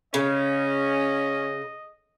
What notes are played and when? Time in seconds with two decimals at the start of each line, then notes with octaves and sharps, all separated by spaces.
0.14 C#3 C#4 D#5